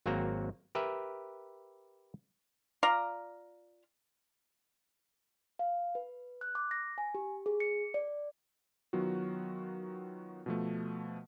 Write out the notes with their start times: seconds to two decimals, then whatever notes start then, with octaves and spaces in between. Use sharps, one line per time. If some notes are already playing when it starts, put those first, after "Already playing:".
0.06 G#1 F#3 A#3 C4 F#4 A#5
0.75 G4 A#4 B4 E5
2.83 F4 D5 F5 A#5
5.59 F5
5.95 B4
6.41 F#6
6.55 D6
6.71 A#6
6.98 G#5
7.14 G4
7.46 G#4
7.60 C#7
7.94 D5
8.93 D#3 F#3 B3 F4 F#4
10.46 B2 F3 A3